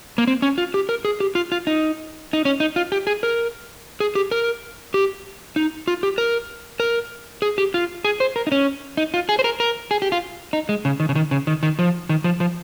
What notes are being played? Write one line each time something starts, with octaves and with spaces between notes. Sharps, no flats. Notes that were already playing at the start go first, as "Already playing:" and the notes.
A#3
C4
C#4
F4
G4
A#4
G#4
G4
F4
F4
D#4
D#4
C#4
D#4
F4
G4
G#4
A#4
G#4
G4
A#4
G4
D#4
F4
G4
A#4
A#4
G#4
G4
F4
G#4
C5
A#4
D#4
C#4
D#4
F4
G#4
C5
A#4
A#4
G#4
G4
F4
D#4
G#3
C#3
D#3
C#3
D#3
C#3
D#3
D#3
F3
D#3
F3
F3